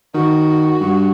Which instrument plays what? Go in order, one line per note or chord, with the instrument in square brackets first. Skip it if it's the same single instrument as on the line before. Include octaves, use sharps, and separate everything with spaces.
[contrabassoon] D#3 [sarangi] F#4
[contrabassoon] G2